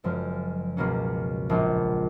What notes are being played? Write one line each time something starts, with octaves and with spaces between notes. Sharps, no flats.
F#1 F#2 F3 G#3
C#2 B2 A#3 C#4
A#1 A#2 G#3 C#4